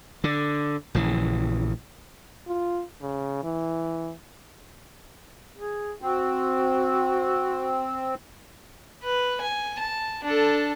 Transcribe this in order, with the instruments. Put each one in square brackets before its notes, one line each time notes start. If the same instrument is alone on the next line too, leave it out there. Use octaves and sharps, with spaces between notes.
[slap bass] D3
A#1 C#3 E3
[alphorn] F4
C#3
E3
[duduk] G#4
[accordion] C4 [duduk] F#4
[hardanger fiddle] B4
G#5
A5
D4 A4